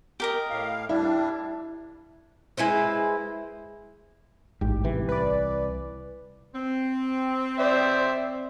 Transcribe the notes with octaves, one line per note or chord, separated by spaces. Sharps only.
G4 A#4 D#5
A2 F5
G3 D4 E4
G#3 E4 B4 C5
A1 G#2 G4
C2 E3
B4 D5
C4
C5 D5 E5